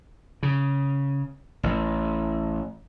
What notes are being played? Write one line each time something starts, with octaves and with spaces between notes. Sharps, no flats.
C#3
A1